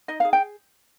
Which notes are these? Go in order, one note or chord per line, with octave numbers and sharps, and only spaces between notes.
D#4 D#5
F5
G#4
G5